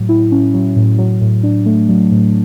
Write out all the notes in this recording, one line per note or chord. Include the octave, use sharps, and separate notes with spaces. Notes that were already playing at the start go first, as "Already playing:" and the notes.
Already playing: A2 F#3
E4
C#4
F#3
A2
F#3
A2
D4
A3
F#3
A2